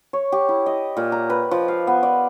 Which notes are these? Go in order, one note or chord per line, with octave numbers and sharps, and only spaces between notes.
C#5
G4
E4
D#5
A#2
A#5
B4
F3
F5
B3
D5